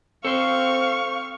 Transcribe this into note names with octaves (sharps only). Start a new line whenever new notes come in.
C4 A4 C5 F5 C#6